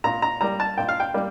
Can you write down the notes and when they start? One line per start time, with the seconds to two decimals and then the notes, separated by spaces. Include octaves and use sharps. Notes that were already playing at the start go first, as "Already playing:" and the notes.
0.04 A#2 A#5
0.22 A#5
0.41 G3 A#3 A#5
0.60 A5
0.78 A#2 G5
0.89 F5
1.00 G5
1.14 G3 A#3